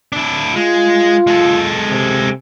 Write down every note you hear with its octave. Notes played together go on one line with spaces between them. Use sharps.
D4 E4
G#3 F4
G#3 A4
C3